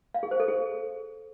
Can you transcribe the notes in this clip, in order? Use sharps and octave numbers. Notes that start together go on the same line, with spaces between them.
F5
G#4
C5
A4
G#4